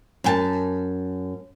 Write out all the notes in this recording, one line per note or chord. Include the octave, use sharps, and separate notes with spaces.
F#2 G5 A5